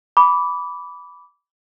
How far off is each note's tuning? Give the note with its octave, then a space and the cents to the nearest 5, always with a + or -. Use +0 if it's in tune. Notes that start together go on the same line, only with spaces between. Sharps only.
B5 +0 D6 -15